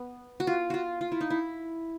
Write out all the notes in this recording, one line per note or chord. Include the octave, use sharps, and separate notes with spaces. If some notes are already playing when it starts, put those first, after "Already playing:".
Already playing: B3
F#4
F4
F4 F#4
F4
E4
D#4
E4